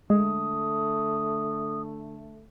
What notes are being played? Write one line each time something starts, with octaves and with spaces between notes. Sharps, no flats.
D3 G#3 A3 D#6